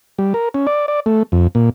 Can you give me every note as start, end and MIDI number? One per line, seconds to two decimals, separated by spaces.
0.19 0.33 55
0.34 0.49 70
0.54 0.67 61
0.67 0.86 74
0.88 1.00 74
1.06 1.23 57
1.32 1.47 41
1.55 1.70 46